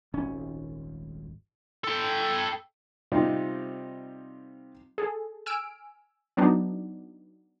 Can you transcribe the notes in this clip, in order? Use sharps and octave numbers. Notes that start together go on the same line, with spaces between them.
D#1 G#1 C#4
A4 G5
C3 G3 C4 D#4 F4
G#4 A4
G#5 E6 F6 D7
F#3 B3 D4 D#4